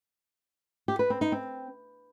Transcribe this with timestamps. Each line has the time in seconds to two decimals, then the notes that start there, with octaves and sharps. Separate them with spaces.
0.88 G4
0.99 B4
1.10 C4
1.21 D#4
1.32 C4